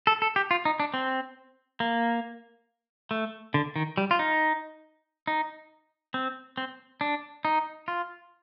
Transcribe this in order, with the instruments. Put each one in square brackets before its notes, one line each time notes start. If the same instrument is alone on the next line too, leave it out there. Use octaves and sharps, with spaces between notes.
[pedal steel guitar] A4
A4
G4
F4
D#4
D4
C4
A#3
A3
D3
D#3
G3
F4
D#4
D#4
C4
C4
D4
D#4
F4